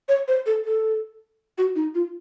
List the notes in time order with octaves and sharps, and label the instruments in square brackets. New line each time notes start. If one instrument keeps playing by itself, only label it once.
[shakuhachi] C#5
C5
A4
A4
F#4
D#4
F4